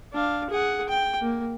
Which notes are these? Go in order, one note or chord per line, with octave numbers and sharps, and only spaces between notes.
D4 F5
G#4 F#5
G5
A#3